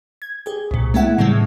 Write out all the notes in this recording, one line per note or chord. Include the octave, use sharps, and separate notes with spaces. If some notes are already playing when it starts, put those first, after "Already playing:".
G#6
G4 G#4
C2 A#2
G#3 A3 B3 E4 E5 F#5
A2 C#3 E3 G3 G#3